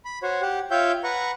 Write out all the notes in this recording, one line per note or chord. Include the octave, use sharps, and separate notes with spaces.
B5
F#4 C5 C#5
G4 F#5
F4 C#5 E5 F5 G5 G6
B4 F#5 A#5 C#6